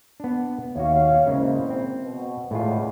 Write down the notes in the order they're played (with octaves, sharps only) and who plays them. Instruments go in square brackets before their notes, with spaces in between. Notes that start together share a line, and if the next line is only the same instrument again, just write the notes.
[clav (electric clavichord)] B3 D4
[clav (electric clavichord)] D#2 F#4 [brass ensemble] C#5 E5 F5
[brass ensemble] F#1 E3 C5 [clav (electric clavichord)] C#3 G#3 A#3
[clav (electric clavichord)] C4
[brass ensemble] B2
[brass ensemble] E2 [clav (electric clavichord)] A2 G#3 F4